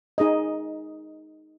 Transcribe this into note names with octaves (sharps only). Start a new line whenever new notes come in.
D#4 G#4 D#5